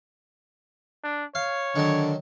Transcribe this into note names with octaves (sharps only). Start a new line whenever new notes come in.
D4
C#5 F5
D3 D#3 F#3